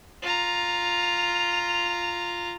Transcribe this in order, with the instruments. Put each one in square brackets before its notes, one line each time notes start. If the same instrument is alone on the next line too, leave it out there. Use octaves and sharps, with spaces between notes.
[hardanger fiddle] F4 A#5